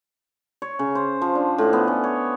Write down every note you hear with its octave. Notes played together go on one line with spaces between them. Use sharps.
C#5
C#3
C5
F3
D4
A2
B3
C#4
C#5